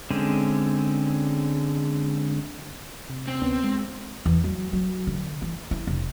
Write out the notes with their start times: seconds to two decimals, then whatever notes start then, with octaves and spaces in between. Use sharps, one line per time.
0.11 D3 G#3 C4 C#4
3.10 C3
3.28 C4
3.41 D2 B3 C#4
3.64 G#3
4.26 E2
4.44 F#3
4.73 F#3
5.07 D3
5.42 E3
5.71 E4
5.87 F1